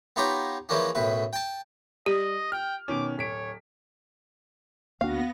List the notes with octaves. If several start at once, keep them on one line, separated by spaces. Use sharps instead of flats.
B3 D#4 F4 G4 C#5 A#5
E3 F3 G#3 A#3 C#4 D4
B1 F#2 A2 B4
G5 A5
G3 G4 D#5
G5 F6
B2 D#3 C#4 D6
D1 C#5 B6 D7
D2 A#3 B3 D4 F#4 F5 A#6